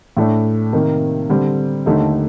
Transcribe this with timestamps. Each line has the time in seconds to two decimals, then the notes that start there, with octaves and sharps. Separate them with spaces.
0.17 A2 A3 D4
0.73 C3 D#3 A#3
1.29 D3 G3 C4
1.86 D#2 D3 A3 D#4 G4